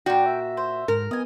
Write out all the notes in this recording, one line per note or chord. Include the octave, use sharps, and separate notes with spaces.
A#2 F#4 D5 G5
E5
C5
G#2 A#4
B3 D#5 G#5